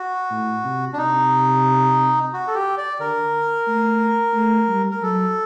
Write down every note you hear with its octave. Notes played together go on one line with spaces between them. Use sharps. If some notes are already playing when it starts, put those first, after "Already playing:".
Already playing: F#4
A2
C3
D4
C3 D#4
F#4
A4
G4
D5
D3 A#4
A3
A3
G3
A#4
F#3 A4